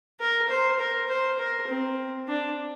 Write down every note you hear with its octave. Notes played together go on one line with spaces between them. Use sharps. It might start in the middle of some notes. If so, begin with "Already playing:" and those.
A#4
C5
A#4
C5
A#4
C4
D4